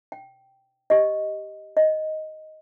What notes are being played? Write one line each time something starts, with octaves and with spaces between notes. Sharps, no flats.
G5
G4 D#5
D#5